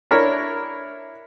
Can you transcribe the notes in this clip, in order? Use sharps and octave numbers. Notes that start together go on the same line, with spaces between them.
D4 E4 A#4 C#5